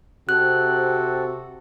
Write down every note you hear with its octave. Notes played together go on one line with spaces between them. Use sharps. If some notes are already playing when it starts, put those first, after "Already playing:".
C3 C4 F#4 A4 F#6